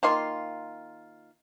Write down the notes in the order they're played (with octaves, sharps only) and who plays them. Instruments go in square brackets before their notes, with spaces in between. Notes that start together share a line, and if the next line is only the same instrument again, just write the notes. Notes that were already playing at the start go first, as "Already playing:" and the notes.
[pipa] D#3 A#3 F4 C6